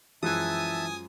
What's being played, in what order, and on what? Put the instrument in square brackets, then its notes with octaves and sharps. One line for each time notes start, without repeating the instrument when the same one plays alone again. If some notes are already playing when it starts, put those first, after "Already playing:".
[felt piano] F#2 F3 G#3 [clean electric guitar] E3 [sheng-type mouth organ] E5 A5 [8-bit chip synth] G#5 D#6